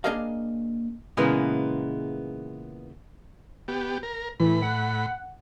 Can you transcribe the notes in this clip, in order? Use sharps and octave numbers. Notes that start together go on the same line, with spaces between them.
A#3 D4 G#4 A#4 D#5 F5
A#2 C#3 E3 G#3 A#3 B3
B3 G4
A#4
A2 E3 B5
F#5